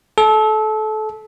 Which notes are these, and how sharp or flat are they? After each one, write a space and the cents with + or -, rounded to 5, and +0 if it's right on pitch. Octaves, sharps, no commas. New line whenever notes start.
A4 -25